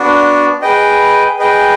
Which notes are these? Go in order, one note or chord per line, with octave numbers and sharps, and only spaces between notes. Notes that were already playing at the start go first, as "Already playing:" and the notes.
Already playing: B3 D4 F#4
G#4 B4 D#5 G5
G#4 B4 D#5 G5